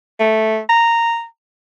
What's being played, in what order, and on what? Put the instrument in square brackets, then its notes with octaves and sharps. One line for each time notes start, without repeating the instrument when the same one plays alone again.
[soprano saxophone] A3
A#5